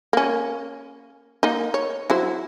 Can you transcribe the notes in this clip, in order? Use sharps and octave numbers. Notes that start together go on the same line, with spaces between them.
A#3 C#4
A#3 D#4
C#5
F#3 E4 C5